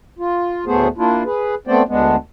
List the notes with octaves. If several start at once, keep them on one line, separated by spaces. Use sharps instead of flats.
F4
D2 A2 A3 B3 G#4 C5
A#3 D4 E4 F4
G#4 B4
A3 B3 C4 C5 D5 G5
D2 G#3 B3 D4